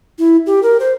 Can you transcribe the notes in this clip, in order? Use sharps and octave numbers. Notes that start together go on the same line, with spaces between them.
E4
G4
A#4
C5